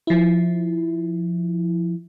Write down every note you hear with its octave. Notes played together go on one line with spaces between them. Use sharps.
F3 E4